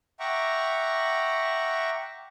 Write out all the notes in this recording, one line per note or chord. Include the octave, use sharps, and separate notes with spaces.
E5 F#5 G5 A#5 C#6 D6